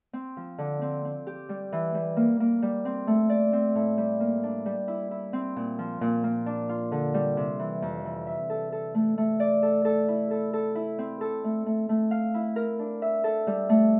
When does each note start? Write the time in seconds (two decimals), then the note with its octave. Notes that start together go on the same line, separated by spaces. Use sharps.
0.13 C4
0.37 F3
0.58 D3
0.81 C4
1.05 C4
1.27 G4
1.49 G3
1.73 E3
1.95 G3
2.17 A#3
2.40 A#3
2.62 G3
2.85 C4
3.07 A3
3.30 D5
3.53 C4
3.75 A2
3.98 G3
4.20 A#3
4.43 D4
4.66 G3
4.88 E4
5.11 E4
5.33 C4
5.56 A#2
5.79 F3
6.01 A#2
6.24 A#3
6.46 D4
6.69 F4
6.92 D3
7.14 G3
7.37 C3
7.59 E3
7.82 F2
8.05 E3
8.27 E5
8.50 A4
8.72 A4
8.95 A3
9.18 A3
9.40 D5
9.63 A4
9.85 A4
10.08 E4
10.31 A4
10.53 A4
10.75 E4
10.99 C4
11.21 A4
11.44 A3
11.66 A3
11.89 A3
12.11 F5
12.34 E4
12.56 A#4
12.79 D4
13.02 E5
13.24 A4
13.47 G3
13.69 A3